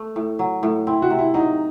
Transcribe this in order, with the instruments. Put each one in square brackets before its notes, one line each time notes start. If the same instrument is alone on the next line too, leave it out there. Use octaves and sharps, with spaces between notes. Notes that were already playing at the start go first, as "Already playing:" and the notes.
Already playing: [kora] A3
A2
F#3
A2
[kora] C4 [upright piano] E4
[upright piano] F#4
[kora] C3
[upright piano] E4
[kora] F#3 [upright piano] D#4